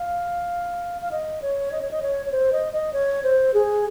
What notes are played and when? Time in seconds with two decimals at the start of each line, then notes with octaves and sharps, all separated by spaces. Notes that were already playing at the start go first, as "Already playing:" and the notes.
Already playing: F5
1.02 F5
1.11 D#5
1.42 C#5
1.72 D#5
1.82 C#5
1.91 D#5
2.02 C#5
2.26 C#5
2.32 C5
2.53 D#5
2.73 D#5
2.93 C#5
3.23 C5
3.54 G#4